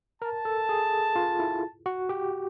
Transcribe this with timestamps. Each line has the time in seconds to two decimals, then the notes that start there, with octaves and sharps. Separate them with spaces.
0.22 A#4 A5
0.45 A4
0.69 G#4
1.16 F4
1.39 E4
1.86 F#4
2.09 G4